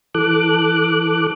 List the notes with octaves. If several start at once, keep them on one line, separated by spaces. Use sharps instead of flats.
E3 A4 D6 F#6